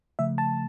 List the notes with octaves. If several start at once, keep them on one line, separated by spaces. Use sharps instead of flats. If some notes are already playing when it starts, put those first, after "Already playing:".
C#3 F3 A3 E5
A5